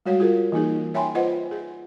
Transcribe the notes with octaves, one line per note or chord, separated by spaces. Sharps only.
G3 G#3 F#4 C#5 F5
F4 G#4 A#4
E3 A#3 D#4 G#4
C#5 E5 G5 G#5 B5 C6
F4 B4 C5 D#5 F#5
G#4